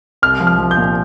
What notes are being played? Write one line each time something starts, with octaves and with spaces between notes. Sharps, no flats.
C2 F6
F3
F6
F3
G6
A#2